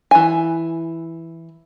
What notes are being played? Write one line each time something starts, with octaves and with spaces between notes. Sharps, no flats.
E3 G#5